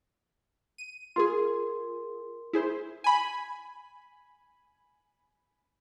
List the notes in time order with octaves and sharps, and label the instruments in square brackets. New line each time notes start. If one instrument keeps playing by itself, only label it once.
[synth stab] D#7
[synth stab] F4 G#4 [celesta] A#4 C6
[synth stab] E4 G#4 C5
G#5 B5